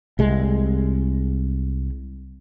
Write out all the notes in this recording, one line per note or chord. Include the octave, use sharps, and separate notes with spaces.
C2 G#3